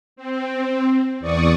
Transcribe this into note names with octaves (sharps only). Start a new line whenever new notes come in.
C4
E2 D5 C#6 D#6